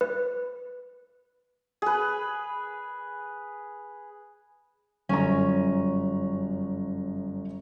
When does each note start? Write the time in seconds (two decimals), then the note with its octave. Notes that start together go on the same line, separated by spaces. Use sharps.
0.01 B4
1.82 G#4 B4
5.09 G1 F#2 C#4 A#5